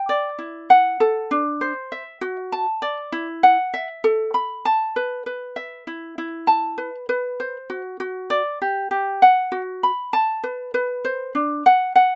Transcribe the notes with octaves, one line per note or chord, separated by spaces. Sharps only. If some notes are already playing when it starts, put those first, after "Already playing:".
Already playing: G5
D5
E4
F#5
A4
D4
C5
E5
F#4
A5
D5
E4
F#5
E5
A4
B5
A5
B4
B4
E5
E4
E4
A5
B4
B4
C5
F#4
F#4
D5
G4
G4
F#5
F#4
B5
A5
B4
B4
C5
D4
F#5
F#5